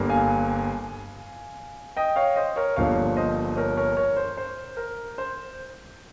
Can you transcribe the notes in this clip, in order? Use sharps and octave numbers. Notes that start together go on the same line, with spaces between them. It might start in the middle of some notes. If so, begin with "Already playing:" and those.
Already playing: G1 G2 G3 A#3
F5 G#5
D#5 G5
C#5 F5
C5 D#5
A#4 C#5
G1 G2 F3 A#3 C#5 F5
C5 D#5
A#4 C#5
A#4 C#5
A#4 C#5
C5
C5
A#4
C5